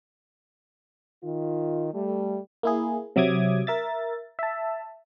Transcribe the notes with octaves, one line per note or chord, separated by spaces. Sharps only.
D#3 F4
G3 A3
A#3 E4 G#4
C3 F#3 E5 D6 D#6 G#6
A#4 E5 A6
E5 A5